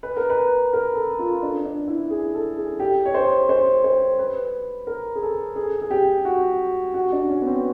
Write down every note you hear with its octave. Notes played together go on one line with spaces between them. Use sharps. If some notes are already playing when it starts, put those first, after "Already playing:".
B4
A#4
B4
A#4
A4
F4
D4
D4
E4
G#4
A4
G#4
G4
C#5
C5
C5
C5
B4
A#4
G#4
A4
G#4
G#4
G4
F#4
F#4
D4
C#4
B3
C4